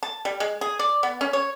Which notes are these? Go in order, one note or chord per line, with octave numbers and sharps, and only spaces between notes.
A5
G3
G#3
G#4
D5
B3
C#4
C#5